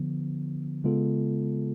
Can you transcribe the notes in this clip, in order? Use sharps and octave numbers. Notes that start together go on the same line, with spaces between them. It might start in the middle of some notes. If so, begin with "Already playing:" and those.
Already playing: D3 F3 B3
C#3 G#3 B3 F4 A4